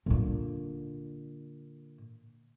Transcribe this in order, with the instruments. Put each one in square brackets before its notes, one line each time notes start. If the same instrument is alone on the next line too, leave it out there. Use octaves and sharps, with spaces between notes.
[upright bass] A#2 D3